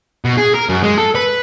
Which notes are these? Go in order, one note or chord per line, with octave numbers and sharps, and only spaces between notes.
B2
G#4
A#4
F#2
G#3
A4
B4